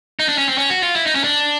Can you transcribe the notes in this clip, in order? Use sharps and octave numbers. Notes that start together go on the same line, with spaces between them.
D#4
D4
C#4
C4
C#4
F#4
F4
E4
D#4
C#4
D4